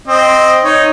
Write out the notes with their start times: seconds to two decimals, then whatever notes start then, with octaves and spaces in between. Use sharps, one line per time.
0.08 C4 D#5
0.64 D#4 C#5